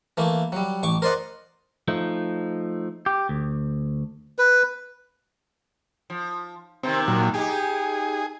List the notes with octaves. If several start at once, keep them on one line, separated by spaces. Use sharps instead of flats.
E3 A3 A#3
F#3 G3
A1 C#6 D6
A#4 C5 D5 D#5 F#5
F3 A3 D#4
G4
D2
B4
F3
C3 D#3 C4
A#2 F#3
D#4 G4 G#4